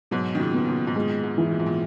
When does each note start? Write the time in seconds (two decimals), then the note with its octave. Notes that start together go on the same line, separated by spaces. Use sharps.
0.11 G#2 B2 F#3
0.35 D#3
0.39 A#2 C#3
0.54 B3
0.67 A#2 C#3
0.87 G#2
0.96 A#2 G#3
1.23 G#2
1.38 E3
1.52 A#2
1.59 G#2
1.66 A#2